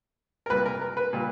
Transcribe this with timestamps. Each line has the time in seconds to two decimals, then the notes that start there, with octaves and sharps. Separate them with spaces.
0.46 A#4
0.50 C2 A#2 G3 B4
0.65 A#4
0.81 A#4
0.97 B4
1.13 A#2 G3